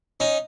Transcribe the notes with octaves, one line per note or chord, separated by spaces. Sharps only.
C#4 D#4